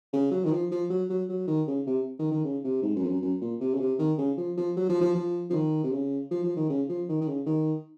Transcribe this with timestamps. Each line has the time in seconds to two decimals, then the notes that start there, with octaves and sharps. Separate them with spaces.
0.13 C#3
0.31 F#3
0.45 D#3
0.52 F3
0.71 F3
0.90 F#3
1.10 F#3
1.29 F#3
1.47 D#3
1.67 C#3
1.86 C3
2.19 D#3
2.31 D#3
2.44 C#3
2.64 C3
2.82 G#2
2.96 F#2
3.04 F2
3.08 F#2
3.21 F#2
3.41 A#2
3.60 C3
3.74 C#3
3.80 C3
3.99 D#3
4.18 C#3
4.38 F3
4.57 F3
4.76 F#3
4.89 F3
5.01 F3
5.15 F3
5.50 F3
5.53 D#3
5.83 C3
5.92 C#3
6.31 F3
6.44 F3
6.56 D#3
6.69 C#3
6.89 F3
7.09 D#3
7.21 D#3
7.27 C#3
7.46 D#3